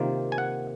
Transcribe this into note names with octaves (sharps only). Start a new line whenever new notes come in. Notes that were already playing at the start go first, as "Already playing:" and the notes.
Already playing: C3 D#3 A#3 F4
G#5
F#5